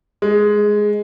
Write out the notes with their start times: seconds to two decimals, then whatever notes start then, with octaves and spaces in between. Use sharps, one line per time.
0.22 G#3